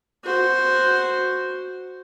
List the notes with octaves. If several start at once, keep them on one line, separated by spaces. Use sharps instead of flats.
F#4 C5